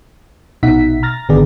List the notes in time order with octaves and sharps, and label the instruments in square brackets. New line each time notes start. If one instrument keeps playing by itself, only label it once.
[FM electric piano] A#1 B2 D#4 E5 F#5 B6
A#5 F6 A6 A#6
G#1 D3 D#3 B3 G#4 D5